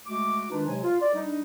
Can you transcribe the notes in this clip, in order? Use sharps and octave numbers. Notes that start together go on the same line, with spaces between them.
G#3 A3 F#4 D6
D#3 G#3 D4 D#4 F4 B4
C3 F#3 G#3 C5 G#5
F4
D5
G3 D4 D#4